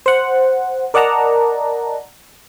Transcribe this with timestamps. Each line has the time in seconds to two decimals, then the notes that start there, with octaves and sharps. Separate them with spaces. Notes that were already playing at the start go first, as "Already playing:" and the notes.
0.06 C5 F#5
0.94 A#4 D5 D#5 F#5 A5 A#5